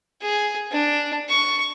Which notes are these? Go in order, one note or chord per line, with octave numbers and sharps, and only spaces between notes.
G#4
D4
C#6